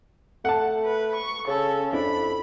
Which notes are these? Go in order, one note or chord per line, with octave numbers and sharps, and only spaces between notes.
A3 F#5 A5
B4
C#6
C#3 C#4 A4
F2 D4 E4 B5